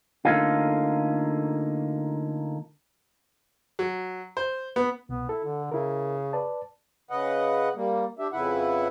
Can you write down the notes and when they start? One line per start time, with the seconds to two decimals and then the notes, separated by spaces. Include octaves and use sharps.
0.25 D3 A3 A#3 C#4 D#4 F4
3.79 F#3
4.37 C5
4.76 B3
5.09 C2 B2 B3
5.29 E4 A4
5.44 D3
5.71 C#3 E4 A#4
6.33 B4 D5 A5
7.11 C#3 B4 D#5 F#5
7.76 G3 A#3
8.19 D4 G4 E5
8.33 F2 C#3 E4 B4 E5 F#5